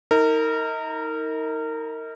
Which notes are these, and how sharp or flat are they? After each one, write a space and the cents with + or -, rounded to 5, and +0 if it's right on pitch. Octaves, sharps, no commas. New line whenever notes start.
D#4 +35 A#4 -25